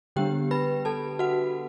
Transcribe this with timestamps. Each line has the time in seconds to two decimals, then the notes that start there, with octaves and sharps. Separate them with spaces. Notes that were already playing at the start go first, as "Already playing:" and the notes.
0.16 D3 G3 B3 D4 G4 G5
0.51 B4 B5
0.85 A4 A5
1.19 F#4 F#5